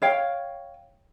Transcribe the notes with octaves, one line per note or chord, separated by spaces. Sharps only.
C#5 F5 G5